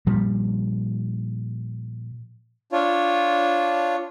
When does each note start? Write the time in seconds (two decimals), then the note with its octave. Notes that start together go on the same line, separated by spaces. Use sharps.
0.07 A#2 F3 G3
2.72 D4 F4 C#5